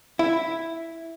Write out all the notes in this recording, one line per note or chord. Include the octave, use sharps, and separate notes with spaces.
E4